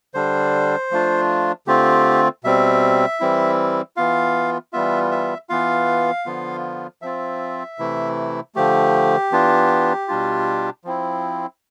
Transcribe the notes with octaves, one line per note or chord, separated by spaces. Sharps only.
D3 G3 D4 C5
F3 A3 D4 F4
D3 A3 C4 F4 G4
B2 G3 C4 E5
E3 G3 C4 E4
E3 B3 F4 F5
E3 G3 B3 F4 E5
E5
E3 B3 F4 F5
D3 F3 B3 F4
F3 C4 F4 E5
C3 E3 A3 E4
D3 F3 A3 G4
E3 B3 D4 F4
B2 G3 D4 F4
F3 C4 E4